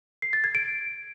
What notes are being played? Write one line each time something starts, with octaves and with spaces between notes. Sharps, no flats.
C7
A6
G#6
D7